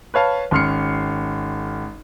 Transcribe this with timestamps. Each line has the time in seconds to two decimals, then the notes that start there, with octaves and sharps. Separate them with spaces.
0.14 B4 C#5 F5 A5
0.51 G#1 C#4 C6 F6 C7 C#7